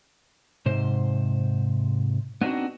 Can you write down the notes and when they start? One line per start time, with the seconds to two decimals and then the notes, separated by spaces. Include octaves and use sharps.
0.66 G#2 C3 C5
2.41 B3 C4 D4 D#4 F#4